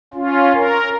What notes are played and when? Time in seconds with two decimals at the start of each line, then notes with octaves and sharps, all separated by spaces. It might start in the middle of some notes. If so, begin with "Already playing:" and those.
0.14 C#4 F4
0.55 A#4